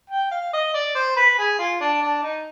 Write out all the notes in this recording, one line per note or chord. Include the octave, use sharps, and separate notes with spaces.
G5
F5
D#5
D5
C5
B4
G#4
F4
D4
D4
D#4